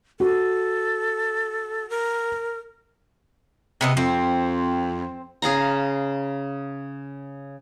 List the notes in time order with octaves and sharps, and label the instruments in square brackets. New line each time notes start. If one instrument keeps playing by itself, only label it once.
[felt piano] F#4 [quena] A4
[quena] A#4
[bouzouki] C3 B3 D#5
[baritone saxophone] F2 [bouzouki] C4
[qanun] C#3 G#4 F5 A#5